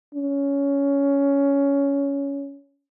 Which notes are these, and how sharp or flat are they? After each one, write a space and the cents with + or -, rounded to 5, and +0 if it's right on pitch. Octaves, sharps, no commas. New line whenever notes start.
C#4 +15